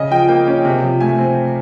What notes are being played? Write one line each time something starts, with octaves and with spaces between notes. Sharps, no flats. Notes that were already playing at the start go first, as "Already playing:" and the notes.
Already playing: C#3 D#5
F3 G5
A#3 G5
C#4
C3
F3
A3 G#5
C4